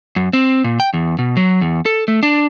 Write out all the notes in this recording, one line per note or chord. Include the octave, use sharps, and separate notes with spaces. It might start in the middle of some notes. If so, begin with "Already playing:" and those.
F#2
C4
A#2
G5
E2
B2
F#3
E2
A4
A3
D4